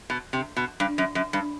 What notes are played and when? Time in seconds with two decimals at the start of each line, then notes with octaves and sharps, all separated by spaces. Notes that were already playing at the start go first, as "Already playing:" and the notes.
0.10 B2
0.33 C3
0.57 B2
0.80 G2
0.98 F#2
1.15 F#2
1.33 G2